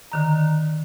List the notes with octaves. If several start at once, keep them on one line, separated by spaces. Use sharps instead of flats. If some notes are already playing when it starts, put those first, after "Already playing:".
D3 D#3 A#5